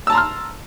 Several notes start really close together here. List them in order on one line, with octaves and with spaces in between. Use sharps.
E6 A5 A#5 C6 F6